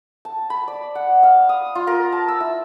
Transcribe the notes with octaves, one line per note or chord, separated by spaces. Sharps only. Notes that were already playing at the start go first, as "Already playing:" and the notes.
A5
B5
D5
F#5
F5
D#6
F4
A#4
A5
E6
E4